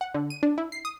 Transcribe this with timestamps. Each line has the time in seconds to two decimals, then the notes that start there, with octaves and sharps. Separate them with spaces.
0.01 F#5
0.14 D3
0.30 D#7
0.43 D4
0.58 E4
0.72 C7
0.85 D#6